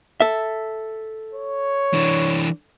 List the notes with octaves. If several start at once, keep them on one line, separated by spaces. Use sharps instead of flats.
A4 E5
C#5
E3 D4